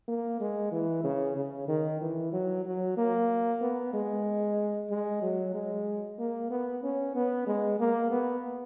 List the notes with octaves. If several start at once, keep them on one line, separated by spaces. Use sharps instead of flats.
A#3
G#3
E3
C#3
C#3
D#3
E3
F#3
F#3
A#3
B3
G#3
G#3
F#3
G#3
A#3
B3
C#4
B3
G#3
A#3
B3